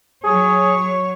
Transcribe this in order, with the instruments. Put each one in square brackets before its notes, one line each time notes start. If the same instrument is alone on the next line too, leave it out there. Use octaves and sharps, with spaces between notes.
[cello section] F#3 C#5 [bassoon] G#4